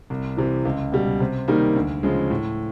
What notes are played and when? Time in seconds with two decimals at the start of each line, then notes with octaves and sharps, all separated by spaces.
0.10 C2
0.37 C3 E3
0.65 C#2
0.92 B2 G3
1.20 C3
1.48 D#3 G3 A#3 D#4
1.76 D2
2.03 C#3 F3 G#3
2.30 A2